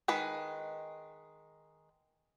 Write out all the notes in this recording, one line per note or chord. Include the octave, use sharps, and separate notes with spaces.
D#3 G#3 B4 B5